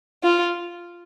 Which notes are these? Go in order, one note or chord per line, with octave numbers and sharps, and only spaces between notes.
F4